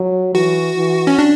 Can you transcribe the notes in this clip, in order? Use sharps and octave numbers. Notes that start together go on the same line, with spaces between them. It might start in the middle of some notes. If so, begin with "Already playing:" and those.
Already playing: F#3
E3 F#4
E3
C#4
D4